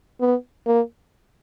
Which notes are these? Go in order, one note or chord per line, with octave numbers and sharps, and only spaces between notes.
B3
A#3